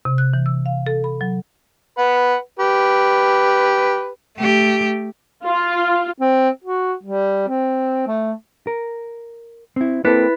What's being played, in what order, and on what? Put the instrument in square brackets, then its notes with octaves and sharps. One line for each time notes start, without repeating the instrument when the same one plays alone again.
[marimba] C3
F#6
E3
E6
F5
A4
B5
F#3
[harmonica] B4 F#5
G4 B4
[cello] A3 G4
[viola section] F4
[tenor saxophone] C4
F#4
G3
C4
A3
[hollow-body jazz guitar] A#4
C4 E4
[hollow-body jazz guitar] A#3 C4 A4 [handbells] E4 B4 B6